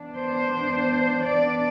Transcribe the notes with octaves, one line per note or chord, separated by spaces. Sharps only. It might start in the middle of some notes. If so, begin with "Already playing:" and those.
Already playing: E3 B3 D4
C5
D5